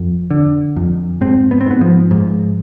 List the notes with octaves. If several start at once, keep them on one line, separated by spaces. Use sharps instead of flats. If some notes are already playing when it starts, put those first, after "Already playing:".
Already playing: F2
D3
F2
G#2 C4
B3
C4
G#2 B3
F3
G#2